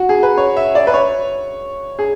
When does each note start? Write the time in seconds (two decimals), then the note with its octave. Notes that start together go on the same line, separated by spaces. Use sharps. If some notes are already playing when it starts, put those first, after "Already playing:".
Already playing: F#4
0.09 G#4
0.23 B4
0.38 C#5
0.57 E5
0.75 D5
0.87 B4
0.94 C#5
1.99 G#4